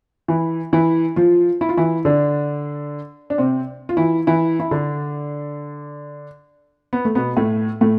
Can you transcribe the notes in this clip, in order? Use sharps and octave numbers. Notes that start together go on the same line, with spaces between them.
E3 E4
E3 E4
F3 F4
E4
F4
E3 E4
D3 D4
D4
C3 C4
F4
E3 E4
E3 E4
E4
D3 D4
B3
A3
B2 B3
A2 A3
A2 A3